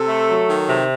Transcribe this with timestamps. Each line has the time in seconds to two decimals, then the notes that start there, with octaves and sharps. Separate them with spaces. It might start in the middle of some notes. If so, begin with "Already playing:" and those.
Already playing: C3 A4
0.09 A3
0.29 F#3
0.49 D#3
0.69 C3